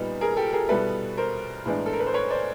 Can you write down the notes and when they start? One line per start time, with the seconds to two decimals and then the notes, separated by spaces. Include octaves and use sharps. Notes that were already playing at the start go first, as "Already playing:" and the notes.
Already playing: A#2 G3 B3 D#4
0.21 G#4 A#4
0.37 G4 A4
0.53 G#4 A#4
0.69 B2 G3 B3 E4 A4 B4
1.17 A#4 C5
1.66 A2 E3 G#3 B3 D4
1.86 A4
1.93 A#4
2.00 B4
2.06 C5
2.14 B4 C#5
2.30 C5 D5